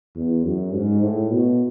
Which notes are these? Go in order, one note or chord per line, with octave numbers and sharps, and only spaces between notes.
E2
F#2
G#2
A2
B2